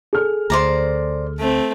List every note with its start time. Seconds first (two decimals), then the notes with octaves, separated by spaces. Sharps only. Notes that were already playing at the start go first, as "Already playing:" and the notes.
0.13 G#4 A4 F6
0.50 D2 C5 D5 A#5
1.39 A3 C4